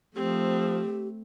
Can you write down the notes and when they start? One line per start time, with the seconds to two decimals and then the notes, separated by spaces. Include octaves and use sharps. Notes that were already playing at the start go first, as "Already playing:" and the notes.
0.15 F3 A3 C4 G4